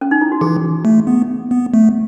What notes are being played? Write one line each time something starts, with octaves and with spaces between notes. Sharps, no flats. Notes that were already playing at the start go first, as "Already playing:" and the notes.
C#4
D#4
E4
F#4
E3 G#4
A3
B3
B3
A3